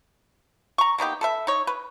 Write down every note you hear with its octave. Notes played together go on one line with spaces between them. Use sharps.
A#5 C#6
A#3 B3 D#4 G4
A4 B4 E5
D#4 C#5
B4